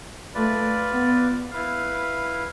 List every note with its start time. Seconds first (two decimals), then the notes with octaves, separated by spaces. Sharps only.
0.34 A3 F4 B4 D5
0.92 B3
1.51 E4 B4 F5